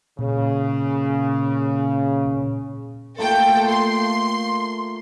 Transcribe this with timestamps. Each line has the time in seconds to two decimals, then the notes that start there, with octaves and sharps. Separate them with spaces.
0.19 A#2 C#3
3.18 A3 A#3 F4 A4 G5
3.68 C6